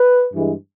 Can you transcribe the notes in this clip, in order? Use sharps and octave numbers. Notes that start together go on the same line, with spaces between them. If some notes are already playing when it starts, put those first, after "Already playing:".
Already playing: B4
G2 E3 G#3